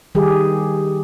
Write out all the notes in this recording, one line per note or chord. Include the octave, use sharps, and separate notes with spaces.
D#3 G3 G4 G#4